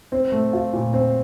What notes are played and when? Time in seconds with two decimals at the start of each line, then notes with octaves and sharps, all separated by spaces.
0.12 C4
0.32 A3
0.53 F4
0.73 A#2
0.93 C4